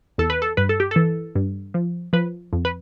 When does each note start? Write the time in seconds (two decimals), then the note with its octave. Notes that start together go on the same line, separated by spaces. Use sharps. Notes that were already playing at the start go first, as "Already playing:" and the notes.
0.18 E2 A4
0.30 B4
0.42 A4
0.57 G2 B4
0.69 A4
0.80 G4
0.91 E3 A4
1.36 G2
1.74 F3
2.13 F3 B4
2.53 F2
2.65 B4